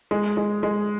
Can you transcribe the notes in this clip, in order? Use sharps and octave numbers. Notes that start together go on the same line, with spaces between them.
G#3
G#3
G#3